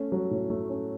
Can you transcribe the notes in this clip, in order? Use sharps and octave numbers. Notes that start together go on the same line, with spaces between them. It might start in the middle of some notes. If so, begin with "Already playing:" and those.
Already playing: A3 C#4
F#3
A2
A3
C#4